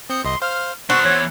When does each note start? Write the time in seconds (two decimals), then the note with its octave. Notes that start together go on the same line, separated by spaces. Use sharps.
0.10 C4 D#6 G6 C#7
0.25 C2 D#5 C6
0.42 C5 F5 F6
0.90 B3 D4 F#4 C5 C#6 E6
1.04 E2 C#5